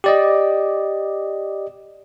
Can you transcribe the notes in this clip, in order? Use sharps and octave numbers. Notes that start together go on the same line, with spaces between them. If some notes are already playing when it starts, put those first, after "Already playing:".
G4 D5 D#5